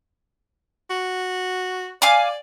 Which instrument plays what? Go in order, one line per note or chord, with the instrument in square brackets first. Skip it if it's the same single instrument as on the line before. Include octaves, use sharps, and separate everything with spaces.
[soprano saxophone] F#4
[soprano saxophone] D5 [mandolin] F5 G#5 D6